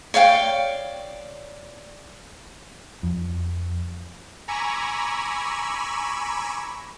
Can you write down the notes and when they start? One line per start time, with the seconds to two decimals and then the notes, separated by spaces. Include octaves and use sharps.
0.14 C#5 D5 F5 G5
3.03 F2
4.48 G#5 A#5 B5 C#6 D6 E6